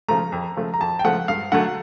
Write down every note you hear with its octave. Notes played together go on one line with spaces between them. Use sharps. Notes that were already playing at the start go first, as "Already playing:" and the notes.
C#3 F3 A3 A#5
F2
C#3 F3 A3
A#5
F2 A5
G5
C#3 F3 A3 F#5
G2 F5
D3 F#3 A3 F#5